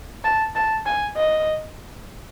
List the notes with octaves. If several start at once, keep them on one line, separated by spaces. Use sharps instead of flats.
A5
A5
G#5
D#5